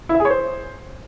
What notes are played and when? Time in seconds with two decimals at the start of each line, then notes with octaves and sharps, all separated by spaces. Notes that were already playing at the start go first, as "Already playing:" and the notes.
0.09 E4
0.15 E5
0.20 G#4
0.25 C#5
0.30 C5